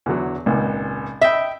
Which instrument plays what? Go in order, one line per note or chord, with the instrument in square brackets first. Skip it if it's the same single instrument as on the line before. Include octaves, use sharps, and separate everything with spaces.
[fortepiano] E2 D3 F#3
G#1 C#2 A#2
[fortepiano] D#5 B5 [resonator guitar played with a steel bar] E5 G5